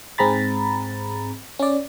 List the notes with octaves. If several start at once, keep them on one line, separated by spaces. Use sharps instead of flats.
G#2 C4 G#4 A#5 B5 A6
C#4 D5